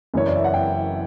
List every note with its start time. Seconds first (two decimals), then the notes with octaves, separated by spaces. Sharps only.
0.14 F#1 F#2 E3 C#5
0.26 D5
0.36 E5
0.44 F#5
0.54 G5